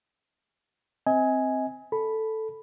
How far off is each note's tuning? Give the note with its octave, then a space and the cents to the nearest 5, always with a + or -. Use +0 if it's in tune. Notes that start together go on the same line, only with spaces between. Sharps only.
C4 +0 D#5 +40 G#5 +0
A4 +0 B5 +0